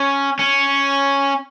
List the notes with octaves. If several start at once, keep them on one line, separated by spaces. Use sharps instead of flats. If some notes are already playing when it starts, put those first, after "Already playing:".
Already playing: C#4
C#4